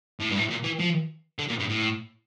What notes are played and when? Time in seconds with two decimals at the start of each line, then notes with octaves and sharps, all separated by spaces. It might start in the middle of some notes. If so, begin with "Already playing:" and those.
0.20 A2
0.30 G2
0.37 A2
0.50 A#2
0.64 E3
0.80 F3
1.39 D3
1.49 A#2
1.59 G2
1.69 A2